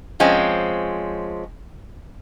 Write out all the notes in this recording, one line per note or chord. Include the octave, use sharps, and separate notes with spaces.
F3 G#3 C4 C#4